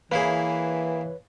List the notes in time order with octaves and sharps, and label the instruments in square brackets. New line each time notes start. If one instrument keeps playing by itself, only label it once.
[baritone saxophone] E3 [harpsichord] A#3 E4 G#4 [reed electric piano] B4 C#5